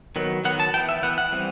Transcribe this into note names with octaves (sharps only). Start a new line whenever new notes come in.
D#3 F#3 B3
D#3 F#3 B3 F#5
A5
E3 B3 G5
E5
E3 B3 F#5
F#5
E3 G3 C4